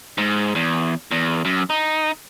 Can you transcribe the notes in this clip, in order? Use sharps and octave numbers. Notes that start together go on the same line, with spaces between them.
G#2
E2
E2
F#2
D#4